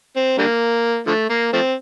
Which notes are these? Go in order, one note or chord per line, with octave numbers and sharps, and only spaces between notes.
C4
D3 G3 A#3
D3 F3 A3
A#3
F3 A3 C4